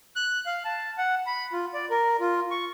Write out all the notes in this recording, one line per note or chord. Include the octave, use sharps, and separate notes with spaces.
F#6
F5
A5
F#5
B5
F4
D5
A#4
F4
C#6